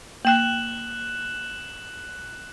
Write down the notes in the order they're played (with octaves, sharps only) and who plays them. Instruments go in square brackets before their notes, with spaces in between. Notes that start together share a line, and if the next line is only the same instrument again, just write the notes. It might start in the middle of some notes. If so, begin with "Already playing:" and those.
[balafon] A#3 G5 [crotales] F#6 E7 F#7